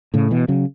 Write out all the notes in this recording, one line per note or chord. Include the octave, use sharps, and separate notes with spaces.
A2 C#3
B2 E3
C#3 F#3